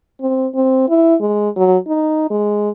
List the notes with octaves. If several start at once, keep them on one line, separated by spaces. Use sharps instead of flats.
C4
C4
E4
G#3
F#3
D#4
G#3